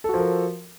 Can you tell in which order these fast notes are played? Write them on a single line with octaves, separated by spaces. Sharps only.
A4 F#4 F3 A#4